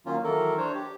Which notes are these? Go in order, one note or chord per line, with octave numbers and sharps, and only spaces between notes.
D#3 F#3 A#3 C#4 F4
D#3 E3 F#3 A4 A#4
D4 C5 C#5
G4